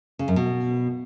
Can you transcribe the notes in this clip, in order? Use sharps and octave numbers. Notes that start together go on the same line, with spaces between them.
C#3
F#2
B2